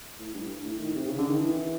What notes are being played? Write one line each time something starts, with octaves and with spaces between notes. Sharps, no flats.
A2
G2
A2
D#3
C3
C#3
D3
D#3
E3